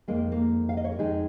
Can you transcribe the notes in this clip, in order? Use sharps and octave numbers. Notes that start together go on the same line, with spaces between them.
F2 D#3 G#3 A#3
A#3
F5
D#5
C#5
A#4
F2 D#3 G#3 D#4 G#4